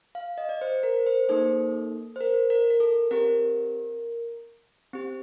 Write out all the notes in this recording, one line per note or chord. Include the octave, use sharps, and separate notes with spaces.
F5
D#5
D5
C5
A#4
C5
A#3 D#4 A4 C5
C5
A#4
A#4
A#4
A4
C4 G4 A#4
C4 G4